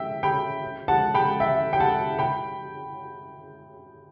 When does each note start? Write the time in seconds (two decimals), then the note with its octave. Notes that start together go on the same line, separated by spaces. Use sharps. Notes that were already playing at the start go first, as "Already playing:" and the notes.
Already playing: E5 G5
0.23 G5 B5
0.88 F#5 A5
1.14 G5 B5
1.40 E5 G5
1.73 G5
1.80 F#5 A5
2.19 G5 B5